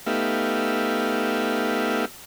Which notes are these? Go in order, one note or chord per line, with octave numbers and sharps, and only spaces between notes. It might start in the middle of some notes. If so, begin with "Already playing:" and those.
A3 B3 D#4 G4 E5 F5